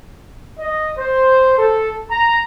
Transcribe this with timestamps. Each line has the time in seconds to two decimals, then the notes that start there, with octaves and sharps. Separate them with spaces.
0.58 D#5
0.97 C5
1.57 A4
2.08 A#5